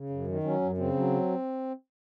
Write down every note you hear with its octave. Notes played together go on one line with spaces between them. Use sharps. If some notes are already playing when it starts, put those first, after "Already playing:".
Already playing: C#3
F#2
D#3
F#3 C#4
F#2
C#3 C4
F#3